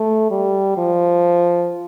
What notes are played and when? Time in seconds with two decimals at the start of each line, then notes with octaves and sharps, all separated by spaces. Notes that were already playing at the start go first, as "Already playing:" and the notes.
Already playing: A3
0.31 G3
0.78 F3